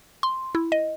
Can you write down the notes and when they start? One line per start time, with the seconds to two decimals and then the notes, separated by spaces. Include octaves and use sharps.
0.23 C6
0.55 E4
0.72 D#5